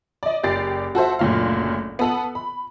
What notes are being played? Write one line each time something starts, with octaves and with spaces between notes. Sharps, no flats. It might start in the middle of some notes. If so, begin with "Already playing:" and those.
D5 D#5
F#1 G4 D5 A6 C7 D7
F#4 A4 C5 E5
F#1 D2 A#2 F#3 F5
B3 A4 F#7
B5